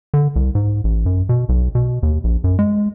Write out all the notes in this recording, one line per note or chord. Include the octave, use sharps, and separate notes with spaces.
D3
C2
G#2
A1
F#2
B2
B1
B2
D#2
A#1
F#2
G#3